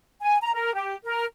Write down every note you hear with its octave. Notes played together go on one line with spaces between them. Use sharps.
G#5
A#5
A#4
G4
A#4